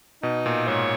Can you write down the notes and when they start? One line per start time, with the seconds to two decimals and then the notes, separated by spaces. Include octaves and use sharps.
0.23 B2 D#4
0.46 A#2
0.68 G#2 C#5